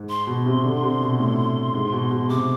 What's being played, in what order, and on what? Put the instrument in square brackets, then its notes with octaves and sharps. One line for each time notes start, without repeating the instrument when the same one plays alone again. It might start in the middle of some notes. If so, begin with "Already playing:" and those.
Already playing: [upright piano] G#2
[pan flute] C6
[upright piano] B2
C3
D3
C3
B2
A2
G#2
B2
B2
[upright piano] C3 [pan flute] D6